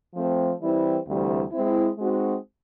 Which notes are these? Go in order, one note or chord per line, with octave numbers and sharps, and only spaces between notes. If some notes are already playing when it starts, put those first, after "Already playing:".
F3 A3 C4
E3 G3 C4 E4
D2 C3 E3 G3
G#3 C4 E4
G#3 C4 D#4 F#4